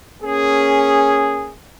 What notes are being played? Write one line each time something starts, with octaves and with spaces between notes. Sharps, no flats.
A#3 C#4 G#4